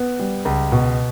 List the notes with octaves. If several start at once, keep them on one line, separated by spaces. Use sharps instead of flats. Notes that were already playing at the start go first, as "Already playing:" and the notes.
Already playing: B3
G3
C#2
B2